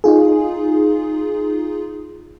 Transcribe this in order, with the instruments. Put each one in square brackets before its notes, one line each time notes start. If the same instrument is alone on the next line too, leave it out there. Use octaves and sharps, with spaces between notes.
[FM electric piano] D#4 F4 G#4